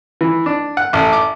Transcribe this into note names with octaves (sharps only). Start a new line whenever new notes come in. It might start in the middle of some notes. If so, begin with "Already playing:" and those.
E3
D4
F#5
A1
D6